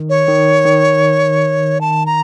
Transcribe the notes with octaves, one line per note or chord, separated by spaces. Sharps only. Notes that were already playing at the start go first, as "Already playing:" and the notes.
Already playing: D#3
C#5
D#3
D#3
A5
A#5